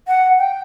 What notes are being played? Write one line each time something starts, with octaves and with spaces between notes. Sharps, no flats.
F#5
G5